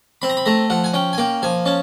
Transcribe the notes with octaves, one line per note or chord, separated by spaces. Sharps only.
C4 B5
A#5
B5
A3 A#5
F3 F#5
G#5
C#4 G5
G#5
A#3 G5
F3 G#5
C#4 A5